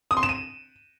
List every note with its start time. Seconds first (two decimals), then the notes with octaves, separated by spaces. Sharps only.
0.11 D#6
0.17 C6
0.23 E7
0.29 D#7